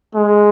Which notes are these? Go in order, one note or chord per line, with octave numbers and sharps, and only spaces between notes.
G#3